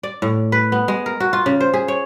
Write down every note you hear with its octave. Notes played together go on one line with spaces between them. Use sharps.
D5
A2
B4
B3
G#3
A#4
F#4
F4
C#3
C5
G#4
C#5